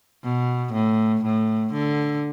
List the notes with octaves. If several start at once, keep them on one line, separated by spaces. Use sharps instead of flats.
B2
A2
A2
D3